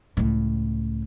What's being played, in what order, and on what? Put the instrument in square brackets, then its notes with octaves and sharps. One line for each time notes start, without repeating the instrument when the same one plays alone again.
[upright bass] C#2 A2